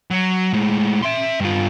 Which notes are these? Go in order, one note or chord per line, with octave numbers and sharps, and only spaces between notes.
F#3
A2 G#3
E5 C6
G2 F4